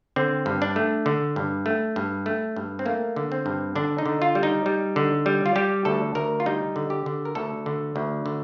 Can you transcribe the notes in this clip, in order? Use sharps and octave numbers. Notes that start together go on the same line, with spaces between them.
D3 C4
G2
D4
A3
D3
G2
A3
G2
A3
G2
C4
A3 A#3
D3
C4
G2
D3 D4
D#4
D3
F4
G3
D#4
G3
D3
G3
F4
G3 G4
D2 A4
D2 A#4
F4
G3 D#4
D3
G4
D3
A#4
D2 A4
D3
D2
D3